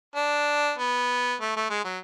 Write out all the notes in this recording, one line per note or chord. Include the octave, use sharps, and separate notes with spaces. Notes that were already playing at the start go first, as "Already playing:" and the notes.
D4
B3
A3
A3
G#3
F#3